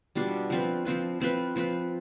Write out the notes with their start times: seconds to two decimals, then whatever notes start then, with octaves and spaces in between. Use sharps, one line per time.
0.15 B2 G3 D4 F4
0.50 F3 C4 F4 B4
0.85 F3 C4 F4 B4
1.20 F3 C4 F4 B4
1.56 F3 C4 F4 B4